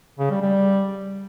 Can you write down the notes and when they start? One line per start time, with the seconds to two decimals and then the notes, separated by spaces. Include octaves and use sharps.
0.19 C#3
0.31 G3
0.42 G3